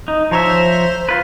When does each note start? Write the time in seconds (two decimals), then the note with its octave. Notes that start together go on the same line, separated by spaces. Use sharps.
0.08 D#4
0.31 F3 C5 C#5 E5 A#5
1.09 F4 B4